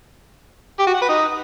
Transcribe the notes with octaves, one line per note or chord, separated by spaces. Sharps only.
G4
F#4
F#5
B4
D#4